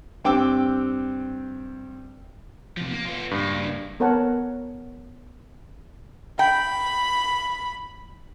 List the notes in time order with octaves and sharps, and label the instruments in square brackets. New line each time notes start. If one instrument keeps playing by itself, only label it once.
[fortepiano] G2 C4 G5 D6 E6
[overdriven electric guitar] C3 F3
A#3
B3 F4
[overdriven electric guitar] C#2 A#3 [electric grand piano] G2
[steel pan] B3 A#4 C#5 F#5 A5
[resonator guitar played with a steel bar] G5 [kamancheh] B5